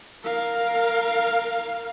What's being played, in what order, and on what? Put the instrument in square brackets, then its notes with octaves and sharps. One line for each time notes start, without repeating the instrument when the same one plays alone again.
[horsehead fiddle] A#4 F5